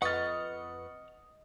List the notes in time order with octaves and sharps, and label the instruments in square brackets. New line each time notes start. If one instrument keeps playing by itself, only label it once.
[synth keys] F2 B4 C#7 [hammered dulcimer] D#5 [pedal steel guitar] F#5 F6 [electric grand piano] C#6 A6